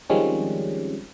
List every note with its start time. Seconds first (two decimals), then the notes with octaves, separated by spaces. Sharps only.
0.10 D#3 F3 G3 G#3 C4 C#4